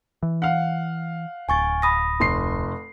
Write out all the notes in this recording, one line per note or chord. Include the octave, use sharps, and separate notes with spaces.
E3
F5 F#5
D1 G#5 C#6 A6
B5 D#6 A#6
F1 C6 C7